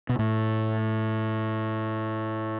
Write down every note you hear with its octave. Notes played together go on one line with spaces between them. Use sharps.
B2
A2